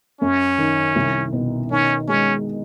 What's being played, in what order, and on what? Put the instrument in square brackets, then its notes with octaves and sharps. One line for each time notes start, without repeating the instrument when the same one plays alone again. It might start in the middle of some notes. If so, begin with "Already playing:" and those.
[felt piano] F#2 [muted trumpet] C#4
[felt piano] D#3
C2
B2
[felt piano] D#3 [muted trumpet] C#4
[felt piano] G#3 [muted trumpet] C#4